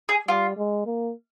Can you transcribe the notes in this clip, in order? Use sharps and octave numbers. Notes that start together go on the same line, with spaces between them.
G#4
G3 F4
G#3
A#3